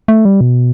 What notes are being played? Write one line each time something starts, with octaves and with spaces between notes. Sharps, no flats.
A3
G3
B2